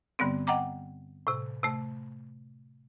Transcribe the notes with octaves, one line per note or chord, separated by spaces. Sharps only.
G2 D3 G3 B3 C4
D#5 F#5 G5 A#5 D6
A2 C3
C3 A3